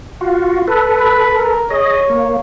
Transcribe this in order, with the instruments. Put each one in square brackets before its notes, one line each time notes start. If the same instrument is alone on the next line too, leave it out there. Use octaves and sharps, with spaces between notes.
[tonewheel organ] F4 F#4
A4 B4
[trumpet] B5
A#4
[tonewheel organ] G#4 D#5 [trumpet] C#5
[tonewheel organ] A#3